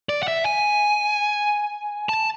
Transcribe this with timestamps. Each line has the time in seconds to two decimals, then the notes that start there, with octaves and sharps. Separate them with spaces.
0.09 D5
0.23 F#5
0.28 E5
0.45 G#5
2.09 A5